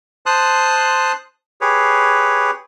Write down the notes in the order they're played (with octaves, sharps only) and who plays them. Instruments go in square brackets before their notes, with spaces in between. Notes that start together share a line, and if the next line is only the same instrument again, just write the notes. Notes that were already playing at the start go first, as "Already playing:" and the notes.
[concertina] C5 A5 C6 D#6 F#6
G4 G#4 B4 C#5